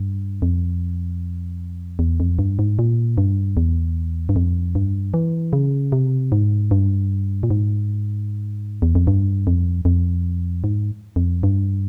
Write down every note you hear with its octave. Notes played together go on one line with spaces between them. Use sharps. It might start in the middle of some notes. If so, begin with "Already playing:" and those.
Already playing: G2
F2
E2
F2
G2
G#2
A#2
G2
E2
G2
F2
G2
E3
C#3
C3
G#2
G2
A#2
G#2
E2
F2
G2
F2
F2
G#2
F2
G2